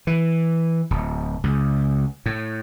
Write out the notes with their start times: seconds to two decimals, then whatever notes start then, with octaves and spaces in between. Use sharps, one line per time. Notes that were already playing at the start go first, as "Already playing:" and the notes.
0.07 E3
0.90 D1
1.44 C#2
2.26 A2